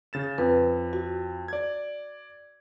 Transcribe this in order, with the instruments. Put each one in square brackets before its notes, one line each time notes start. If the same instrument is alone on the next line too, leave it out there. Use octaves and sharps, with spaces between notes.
[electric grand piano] C#3 A6 E7
[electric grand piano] F2 [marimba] B4
[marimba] F#4
[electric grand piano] D5 G#6